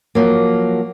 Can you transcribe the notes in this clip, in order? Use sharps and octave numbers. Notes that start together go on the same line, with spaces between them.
F3 F#3 A#3